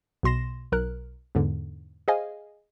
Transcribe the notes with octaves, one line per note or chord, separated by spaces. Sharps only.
B1 B2 C6 A#6 E7
B1 A#4 F#6
E2 G#2 D3
G#4 C5 D#5 F5 G#5